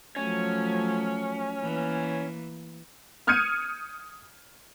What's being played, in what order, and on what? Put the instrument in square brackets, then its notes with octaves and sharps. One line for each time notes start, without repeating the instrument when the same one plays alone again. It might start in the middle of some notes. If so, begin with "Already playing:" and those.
[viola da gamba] F3 F#3 A3 [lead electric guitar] C#4
[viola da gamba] E3 A#3
[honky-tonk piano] D#6 F6 G6 G#6 C#7 D#7